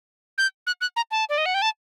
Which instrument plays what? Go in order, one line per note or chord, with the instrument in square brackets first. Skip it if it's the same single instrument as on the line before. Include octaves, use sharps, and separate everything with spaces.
[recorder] G6
F#6
F#6
A#5
A5
D5
D#5
F#5
G5
A5